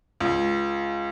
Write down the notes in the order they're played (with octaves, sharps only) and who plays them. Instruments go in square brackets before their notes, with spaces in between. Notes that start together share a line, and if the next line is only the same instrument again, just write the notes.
[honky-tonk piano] C#2